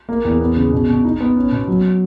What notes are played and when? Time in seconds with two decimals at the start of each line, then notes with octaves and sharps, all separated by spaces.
0.09 A#3
0.25 E2
0.40 B3
0.56 C#3
0.72 B2
0.89 B2
1.04 D#4
1.20 B3
1.36 C#4
1.52 B2
1.68 F#3